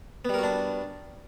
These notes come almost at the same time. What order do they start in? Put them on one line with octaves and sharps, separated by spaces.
B3 G3 A#4 F#4 D4